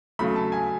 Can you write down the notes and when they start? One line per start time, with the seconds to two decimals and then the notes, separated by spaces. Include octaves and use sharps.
0.19 C#3 F#3 A3 B5
0.36 A5
0.52 G#5